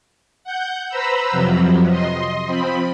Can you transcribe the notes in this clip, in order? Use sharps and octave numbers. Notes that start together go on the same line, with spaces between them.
F#5 G6
B4 C5 A#5 B5 E6
F2 C3 F3 F#3
D#5 C6
F3 C4 B5